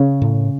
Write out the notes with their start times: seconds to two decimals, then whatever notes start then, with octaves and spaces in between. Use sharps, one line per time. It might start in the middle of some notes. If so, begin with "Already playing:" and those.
Already playing: C#3 C#4
0.22 A2